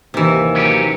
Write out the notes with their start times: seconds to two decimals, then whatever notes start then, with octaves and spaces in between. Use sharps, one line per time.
0.14 D#2 C3 E3
0.54 F#3 C#4 G4